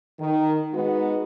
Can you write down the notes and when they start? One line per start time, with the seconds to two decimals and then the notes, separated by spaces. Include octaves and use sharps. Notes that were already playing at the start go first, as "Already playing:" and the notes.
0.18 D#3
0.73 G#3 B3 D#4 F#4